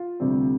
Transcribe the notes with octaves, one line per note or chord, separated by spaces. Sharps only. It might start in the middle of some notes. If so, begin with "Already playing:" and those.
Already playing: F4
D2 C3 G3 C4